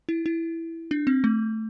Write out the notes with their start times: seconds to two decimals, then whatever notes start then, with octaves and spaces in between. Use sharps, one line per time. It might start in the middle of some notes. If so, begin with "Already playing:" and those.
0.09 E4
0.26 E4
0.91 D4
1.07 C4
1.24 A3